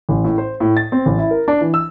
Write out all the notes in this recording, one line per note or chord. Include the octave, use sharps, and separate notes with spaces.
A1
A2
C5
A2
A6
C4
A1
E4
A#4
D4
E3
E6